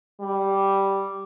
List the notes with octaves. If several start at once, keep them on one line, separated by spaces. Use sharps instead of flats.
G3